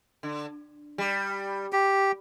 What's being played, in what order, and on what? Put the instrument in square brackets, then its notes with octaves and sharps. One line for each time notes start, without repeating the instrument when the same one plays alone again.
[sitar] D3
G3
[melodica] G4